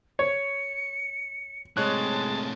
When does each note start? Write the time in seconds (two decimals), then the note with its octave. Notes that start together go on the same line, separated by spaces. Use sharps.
0.19 C#5 C#7
1.77 A2 C3 G#3 C#5 A5 F#6